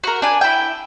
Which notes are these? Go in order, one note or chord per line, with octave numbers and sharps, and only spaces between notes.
F#4 A#4
D4 G#5
E4 G5